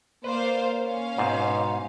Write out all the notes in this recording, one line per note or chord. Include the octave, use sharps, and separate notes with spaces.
A#3 B4 C5 D5 F5
C#4 F5
G#2 B2